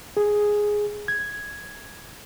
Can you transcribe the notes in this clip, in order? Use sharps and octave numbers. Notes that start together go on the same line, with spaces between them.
G#4
G#6